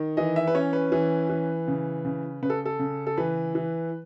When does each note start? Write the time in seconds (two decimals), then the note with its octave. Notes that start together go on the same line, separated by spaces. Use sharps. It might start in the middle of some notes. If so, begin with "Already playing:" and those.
Already playing: D#3
0.17 E3 D#5
0.36 E5
0.47 B4
0.55 C#4 C#5
0.73 B4
0.92 E3
1.30 E3
1.67 C#3
2.05 C#3
2.42 C#3 B4
2.50 A4
2.65 A4
2.79 C#3
3.07 A4
3.17 E3 B4
3.55 E3